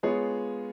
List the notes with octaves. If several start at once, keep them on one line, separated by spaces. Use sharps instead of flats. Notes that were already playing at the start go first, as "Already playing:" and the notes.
G#3 B3 F4 G#4 C#5